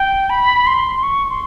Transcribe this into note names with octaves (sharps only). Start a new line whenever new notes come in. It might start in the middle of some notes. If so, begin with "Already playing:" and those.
Already playing: G5
B5
C6
C#6
C6